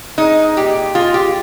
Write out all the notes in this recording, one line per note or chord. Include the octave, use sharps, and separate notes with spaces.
G#3 D#4
A#2 G4
G#3 F4
G4